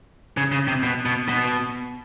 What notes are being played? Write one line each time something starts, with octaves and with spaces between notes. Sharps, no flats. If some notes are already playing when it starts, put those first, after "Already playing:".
C#3
C#3
C3
B2
B2
B2